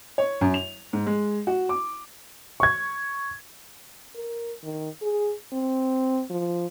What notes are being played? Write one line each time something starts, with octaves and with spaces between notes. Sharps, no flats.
C#5
F#2
F7
G#2
G#3
F#4
D6
C#6 G#6
A#4
D#3
G#4
C4
F3